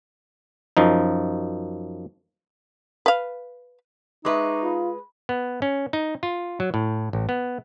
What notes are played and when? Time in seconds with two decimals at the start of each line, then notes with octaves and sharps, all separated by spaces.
0.77 F#2 F3 D#4
3.06 B4 F5
4.25 G#3 D#4 B4 E5 C#6 D6
4.63 F4 B5
5.29 B3
5.62 C#4
5.93 D#4
6.23 F4
6.60 F#3
6.74 A2
7.13 A1
7.29 B3